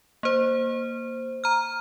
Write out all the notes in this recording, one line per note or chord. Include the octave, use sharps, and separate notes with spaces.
A#3 C5
A#5 F6